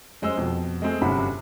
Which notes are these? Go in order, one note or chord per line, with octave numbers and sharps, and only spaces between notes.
F#2 G#3 C5 E6
F2 B2
G#3 A3 C4 G#4
G1 F#2 C3 F#5 B5